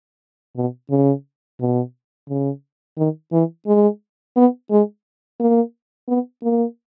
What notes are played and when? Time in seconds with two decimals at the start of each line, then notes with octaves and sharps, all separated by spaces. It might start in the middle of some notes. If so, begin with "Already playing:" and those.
0.56 B2
0.90 C#3
1.60 B2
2.29 C#3
2.98 D#3
3.32 E3
3.67 G#3
4.36 B3
4.71 G#3
5.40 A#3
6.08 B3
6.43 A#3